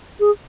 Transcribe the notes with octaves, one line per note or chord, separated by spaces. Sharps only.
G#4